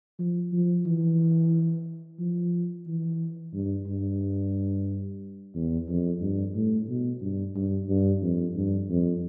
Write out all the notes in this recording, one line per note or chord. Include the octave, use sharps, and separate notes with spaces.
F3
F3
E3
F3
E3
G2
G2
E2
F2
G2
A2
B2
G2
G2
G2
F2
G2
F2